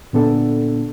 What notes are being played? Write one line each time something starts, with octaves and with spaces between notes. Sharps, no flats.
A#2 D3 B3 D4 A4